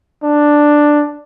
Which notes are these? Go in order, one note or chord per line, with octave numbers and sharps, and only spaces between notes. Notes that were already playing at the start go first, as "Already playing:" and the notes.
D4